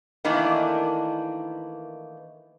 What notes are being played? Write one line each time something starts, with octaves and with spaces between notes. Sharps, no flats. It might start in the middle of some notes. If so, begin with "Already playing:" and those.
D#3 E3 A3 A#3 D4